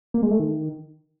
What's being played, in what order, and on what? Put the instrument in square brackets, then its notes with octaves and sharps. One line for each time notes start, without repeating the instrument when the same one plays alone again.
[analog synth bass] A#3
G#3
A3
D#3